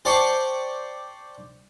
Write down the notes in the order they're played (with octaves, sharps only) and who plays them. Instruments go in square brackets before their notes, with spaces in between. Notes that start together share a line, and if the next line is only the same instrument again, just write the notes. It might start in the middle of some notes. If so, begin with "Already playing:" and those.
[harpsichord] G4 C5 D5 A5 C6 C#6